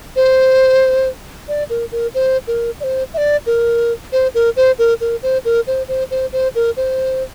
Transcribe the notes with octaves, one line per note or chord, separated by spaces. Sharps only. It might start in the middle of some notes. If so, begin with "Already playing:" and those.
C5
D5
A#4
A#4
C5
A#4
D5
C5
E5
D5
A#4
C5
A#4
C5
A#4
A#4
C5
A#4
C5
C5
C5
C5
A#4
C5